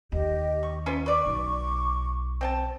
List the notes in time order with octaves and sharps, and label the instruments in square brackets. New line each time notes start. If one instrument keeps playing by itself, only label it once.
[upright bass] D#2 [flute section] G4 D#5
[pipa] C#6
C#4 F4 B4
[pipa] B4 D5 [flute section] C#6 D6
[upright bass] B1
[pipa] C4 G5 A5